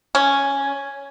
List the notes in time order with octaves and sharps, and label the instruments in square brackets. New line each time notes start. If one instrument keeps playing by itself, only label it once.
[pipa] C#4